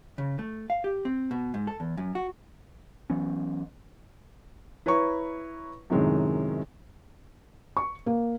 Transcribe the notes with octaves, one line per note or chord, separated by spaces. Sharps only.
C#3
A3
F5
G4
C4
B2
G#2
A4
E2
F#2
F#4
E3 F#3 B3 C#4
E4 B4 C#5 A#5 C#6
F#2 A2 C3 D#3 G#3
C#6
A#3